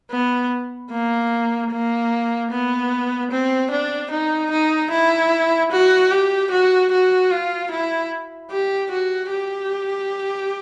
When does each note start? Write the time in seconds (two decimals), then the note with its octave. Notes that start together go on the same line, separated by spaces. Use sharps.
0.11 B3
0.91 A#3
1.71 A#3
2.51 B3
3.31 C4
3.71 D4
4.11 D#4
4.51 D#4
4.91 E4
5.72 F#4
6.11 G4
6.51 F#4
6.92 F#4
7.31 F4
7.71 E4
8.51 G4
8.91 F#4
9.31 G4